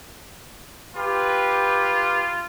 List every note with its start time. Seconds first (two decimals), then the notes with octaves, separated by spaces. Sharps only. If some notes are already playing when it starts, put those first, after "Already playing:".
0.96 F4 G4 B4